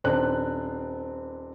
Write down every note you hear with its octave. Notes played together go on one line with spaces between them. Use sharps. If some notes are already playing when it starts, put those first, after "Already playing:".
D#1 C4 D4 F#6